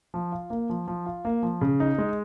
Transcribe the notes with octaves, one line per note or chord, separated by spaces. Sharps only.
F3
F4
A#3
F3
F3
F4
A#3
F3
C#3
D#4
G#3